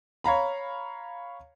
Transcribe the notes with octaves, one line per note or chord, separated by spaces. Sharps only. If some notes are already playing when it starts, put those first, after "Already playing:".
C#5 F5 A#5 B5